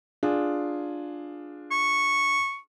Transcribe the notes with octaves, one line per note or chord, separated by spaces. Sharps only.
D4 F4 G#4
C#6